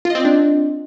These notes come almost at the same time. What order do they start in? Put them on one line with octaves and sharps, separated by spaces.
F4 D#5 C4 D5 D4